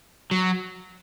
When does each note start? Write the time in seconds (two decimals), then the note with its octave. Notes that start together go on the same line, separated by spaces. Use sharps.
0.31 F#3